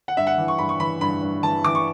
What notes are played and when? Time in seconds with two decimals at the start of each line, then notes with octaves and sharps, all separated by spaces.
0.08 F#5
0.17 G2 E5
0.27 F#5
0.38 E3
0.48 C#6
0.59 G2 B5
0.69 C#6
0.80 E3 B5
1.01 G2 B5
1.23 G2
1.43 E3 A5
1.64 E3 D6
1.75 C#6